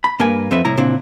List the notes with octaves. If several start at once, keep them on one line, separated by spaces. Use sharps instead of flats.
B5
G2 A#3 A#4 B4 G#5
F2 C4 A4 B4 E5
C2 A2 E4 A#5
A#2 C#3 C4 D4 E4